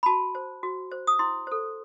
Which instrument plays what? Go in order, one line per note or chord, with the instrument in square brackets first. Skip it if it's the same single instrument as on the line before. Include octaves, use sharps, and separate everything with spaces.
[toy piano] B5
F#4 A5
C5
F#4
C5
D#6
E4 C6
A4 C5